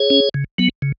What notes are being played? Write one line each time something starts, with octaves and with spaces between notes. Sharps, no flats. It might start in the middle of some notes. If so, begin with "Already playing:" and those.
Already playing: G#4 C#5
C#4
C#3
F#3 B3
C#3